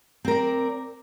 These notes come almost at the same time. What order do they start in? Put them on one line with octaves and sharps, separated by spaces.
C4 A#4 D5